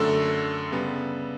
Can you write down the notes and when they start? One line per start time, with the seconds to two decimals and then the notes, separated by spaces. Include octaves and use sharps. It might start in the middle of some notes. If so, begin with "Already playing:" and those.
Already playing: F#2 D3 A3 A4
0.72 C#3 G3 B3